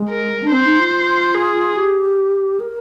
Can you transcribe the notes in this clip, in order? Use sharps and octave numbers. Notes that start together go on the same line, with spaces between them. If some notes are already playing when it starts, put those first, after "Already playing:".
Already playing: G#3
A#4
D4
C4 C5
D#4
F4
G#4
G4
A#4